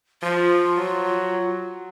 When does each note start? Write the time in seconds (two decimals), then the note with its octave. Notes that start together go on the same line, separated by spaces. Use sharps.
0.22 F3 F4
0.77 F#3